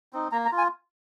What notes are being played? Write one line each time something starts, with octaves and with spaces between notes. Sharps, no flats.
C4 D#4
A#3 A#5
A#5
F4
G#5